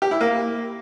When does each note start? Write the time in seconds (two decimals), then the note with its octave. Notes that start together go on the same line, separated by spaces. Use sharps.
0.02 G4
0.11 E4
0.21 A#3